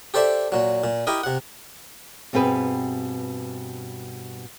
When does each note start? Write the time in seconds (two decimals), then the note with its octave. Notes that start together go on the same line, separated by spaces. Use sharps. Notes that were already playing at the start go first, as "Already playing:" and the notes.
0.14 G4 A4 C5 D5 E5
0.52 A#2 F#3
0.84 A#2
1.07 E4 G4 A#4 D#5
1.23 C3 F#5
2.33 G2 B2 C4 G#4 B4